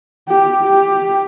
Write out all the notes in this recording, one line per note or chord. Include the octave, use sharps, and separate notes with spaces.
G4
G4